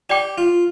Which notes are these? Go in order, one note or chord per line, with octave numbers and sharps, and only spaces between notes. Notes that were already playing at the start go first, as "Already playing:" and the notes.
G4 D5 G5 D6
F4